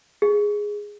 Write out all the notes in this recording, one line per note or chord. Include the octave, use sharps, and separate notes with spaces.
G#4